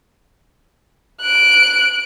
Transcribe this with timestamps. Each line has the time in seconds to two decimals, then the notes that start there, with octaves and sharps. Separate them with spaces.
1.21 F#6 D7